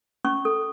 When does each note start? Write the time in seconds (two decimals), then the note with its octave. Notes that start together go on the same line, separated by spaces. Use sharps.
0.25 C#4 C#6
0.45 A4